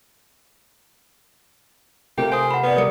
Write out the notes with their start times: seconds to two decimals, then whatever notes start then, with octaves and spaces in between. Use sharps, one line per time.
2.18 C3 A3 F4 G4 A#4 G5
2.32 C5 G#5 D#6
2.51 F#5 B5
2.63 B3 B4 D5
2.76 G3 A#4 D5 D#6 C#7